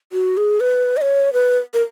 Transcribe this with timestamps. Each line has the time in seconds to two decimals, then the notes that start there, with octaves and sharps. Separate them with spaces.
0.12 F#4
0.37 G#4
0.60 B4
0.97 D#5
1.01 C#5
1.33 B4
1.74 A#4